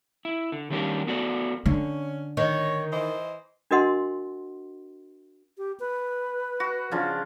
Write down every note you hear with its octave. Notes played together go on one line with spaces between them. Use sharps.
E4
D3
D#3 G3 C#4 D4 G4 A#4
B3 F#4 A4 D5
D3 C#4
D#3 C#5
E3 C5 D#5
D4 F#4 A#4 D#5 F#5 C6
G4
B4
F#4
C#3 F3 D4 F4